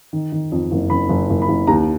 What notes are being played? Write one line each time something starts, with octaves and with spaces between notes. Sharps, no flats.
D#3
D#3
F2
F#1
F#1 B5
F#1
F#1
B5
F#1
D#2 A#5